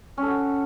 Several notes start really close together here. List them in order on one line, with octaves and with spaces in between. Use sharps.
C#4 A4 F#4